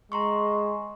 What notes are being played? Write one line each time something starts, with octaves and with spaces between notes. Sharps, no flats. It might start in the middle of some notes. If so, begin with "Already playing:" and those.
G#3 A#5 C6 C#6